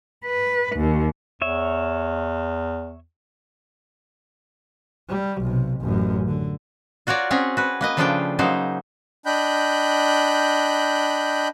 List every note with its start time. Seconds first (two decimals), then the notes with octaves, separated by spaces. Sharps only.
0.24 B4
0.76 D#2
1.42 E2 C#5 E5
5.09 G3
5.42 B1 C3
5.81 A1 F#2
6.27 D3
7.07 F4 F#4 A#4 C#5 D5
7.31 C4 C#4 G#4 C#5 F#5
7.57 F#4 B4
7.81 A#3 B4 D#5
7.97 C#3 F3 A3 D4 F4 G5
8.39 C#3 F#3 A#3 D#4 C5
9.26 D4 D#5 G5 B5 F#6 G6